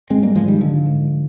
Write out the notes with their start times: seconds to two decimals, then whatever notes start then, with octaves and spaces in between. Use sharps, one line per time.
0.10 G#1 G#3 C4
0.23 G3 A#3
0.35 G#2 F3 G#3
0.48 D#3 G3
0.61 G#1 D3 F3
0.86 G#2